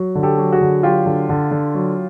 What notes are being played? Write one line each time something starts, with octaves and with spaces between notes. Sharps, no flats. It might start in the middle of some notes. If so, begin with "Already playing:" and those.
Already playing: F#3
D3
G4 A4
F#3
F#4 G#4
D3
F#3 F4 G4
D3
D3
D3
F#3